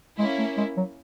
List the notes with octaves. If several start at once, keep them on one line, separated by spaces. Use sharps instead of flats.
G#3 A#3 C#4 E4
A3
G#3
F#3